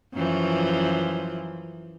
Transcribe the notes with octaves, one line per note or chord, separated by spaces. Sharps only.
F#2 E3 F3